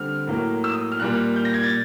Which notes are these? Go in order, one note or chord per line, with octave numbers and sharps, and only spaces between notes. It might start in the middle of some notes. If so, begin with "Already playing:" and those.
Already playing: D3 G3 C4 F6
A2 F#3 A#3
E6
D#6
F6
A#2 G3 A#3 F#6
G6
A#6
G#6
A6